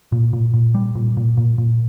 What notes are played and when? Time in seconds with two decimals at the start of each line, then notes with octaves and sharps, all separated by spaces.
0.12 A#2
0.33 A#2
0.54 A#2
0.74 G3
0.95 A#2
1.17 A#2
1.37 A#2
1.58 A#2